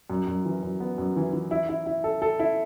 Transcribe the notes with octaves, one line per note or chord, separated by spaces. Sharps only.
F#2
F#2
E3
F#2
B3
F#2
E3
E3
E4
E4
E4
A4
A4
E4